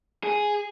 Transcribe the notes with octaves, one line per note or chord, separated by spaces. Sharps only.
G#4